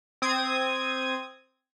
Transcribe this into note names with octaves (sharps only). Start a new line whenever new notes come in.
C4 D#6 G#6